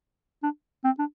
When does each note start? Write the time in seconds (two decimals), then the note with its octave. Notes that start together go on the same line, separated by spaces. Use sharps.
0.43 D4
0.84 C4
0.99 D4